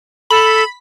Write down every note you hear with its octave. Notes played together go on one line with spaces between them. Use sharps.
A4 B5